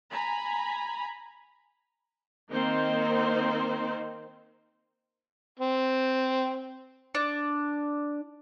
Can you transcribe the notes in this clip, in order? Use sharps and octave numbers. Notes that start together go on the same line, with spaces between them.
G#5 A#5 B5
D#3 A#3 C4 D#4 C5
C4
D4